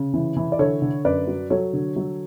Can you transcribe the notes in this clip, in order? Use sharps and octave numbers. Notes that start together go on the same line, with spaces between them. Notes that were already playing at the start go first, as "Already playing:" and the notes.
Already playing: C#3
E3
E3
D5
D3 A4 C#5
D3
F#2 B4 D5
F#3
F#3 A4 C#5
D3
F#3